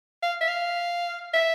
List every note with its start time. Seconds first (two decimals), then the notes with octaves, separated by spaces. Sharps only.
0.23 F5
0.41 E5
0.48 F5
1.34 E5